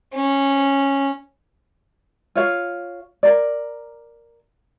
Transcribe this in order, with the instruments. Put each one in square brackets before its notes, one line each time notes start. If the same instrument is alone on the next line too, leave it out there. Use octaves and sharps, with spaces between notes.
[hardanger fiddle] C#4
[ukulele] F4 C#5 F5
A#4 D5